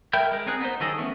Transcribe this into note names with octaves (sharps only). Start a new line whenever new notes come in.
A#4 E5 G5 B5 G6
G#3 A#4
C4 D#4 G#4 F#6
B3 D#4 C5
D#3 F#3 G#4 A4 D#5
E3 A3 B3 C#4